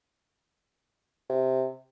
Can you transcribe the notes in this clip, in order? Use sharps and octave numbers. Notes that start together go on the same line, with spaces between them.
C3